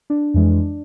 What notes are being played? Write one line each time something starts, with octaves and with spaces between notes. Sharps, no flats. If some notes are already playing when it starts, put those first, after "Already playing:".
D4
F2 E3 G#3